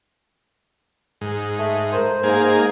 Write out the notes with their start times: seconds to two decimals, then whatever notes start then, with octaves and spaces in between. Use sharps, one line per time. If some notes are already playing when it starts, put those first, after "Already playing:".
1.21 G#2
1.59 A3
1.92 A#4 C5
2.24 G#2 A#3 G#4